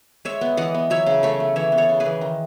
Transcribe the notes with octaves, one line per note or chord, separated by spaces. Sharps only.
G#3 C#5 E5
B3
E3 D#5 F#5
B3
F#3 C#5 E5
C#3
A3 C#5 E5
A3
E3 C#5 E5
B3
A4 C#5
C#3
G#4 B4
E3
D#3